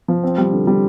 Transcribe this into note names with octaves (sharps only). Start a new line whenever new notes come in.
F3
C4
G3
D3
G3